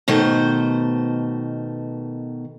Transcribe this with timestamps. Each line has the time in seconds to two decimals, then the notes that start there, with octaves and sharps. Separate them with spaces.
0.08 B2 D#3 A3 C5